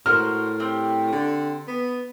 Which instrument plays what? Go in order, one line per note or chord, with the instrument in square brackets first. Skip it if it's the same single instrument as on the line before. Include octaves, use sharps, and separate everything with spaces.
[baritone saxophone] A2 [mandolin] F#4 C5 [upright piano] A#4 F6
[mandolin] C4 G4
[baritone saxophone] D3
B3